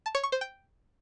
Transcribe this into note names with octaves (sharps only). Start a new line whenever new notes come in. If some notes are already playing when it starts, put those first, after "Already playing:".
A5
C#5
C#6
C5
G5